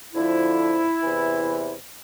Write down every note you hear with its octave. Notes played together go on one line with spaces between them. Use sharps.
F2 D3 F3 E4
E2 C3 E3